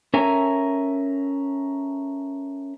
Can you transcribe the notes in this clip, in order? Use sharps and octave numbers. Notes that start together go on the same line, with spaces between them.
C#4 A4 A#4 E5 G#5